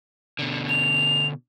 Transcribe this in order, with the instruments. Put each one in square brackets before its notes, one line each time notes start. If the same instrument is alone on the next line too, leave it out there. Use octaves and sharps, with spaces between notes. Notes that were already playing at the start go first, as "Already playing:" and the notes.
[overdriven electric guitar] B2 D3
[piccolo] F7